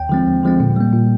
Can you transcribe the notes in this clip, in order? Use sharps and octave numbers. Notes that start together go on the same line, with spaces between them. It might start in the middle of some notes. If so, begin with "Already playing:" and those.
Already playing: D#2 G5
D3 F3 G#3 C4
D#2
D3 F3 G#3 C4
A#2
G3 A#3
A#2